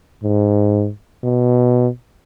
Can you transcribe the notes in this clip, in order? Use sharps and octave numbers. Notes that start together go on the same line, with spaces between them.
G#2
B2